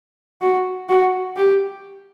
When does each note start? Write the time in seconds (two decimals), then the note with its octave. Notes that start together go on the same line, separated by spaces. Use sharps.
0.42 F#4
0.89 F#4
1.37 G4